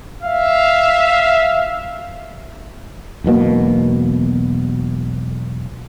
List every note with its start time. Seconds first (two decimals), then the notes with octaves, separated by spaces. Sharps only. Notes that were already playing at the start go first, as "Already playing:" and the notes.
0.23 E5 F5
3.24 E1 B1 B2 A#3